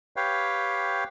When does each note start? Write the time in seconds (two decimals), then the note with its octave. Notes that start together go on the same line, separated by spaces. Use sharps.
0.16 G4 B4 C#5 F5 G5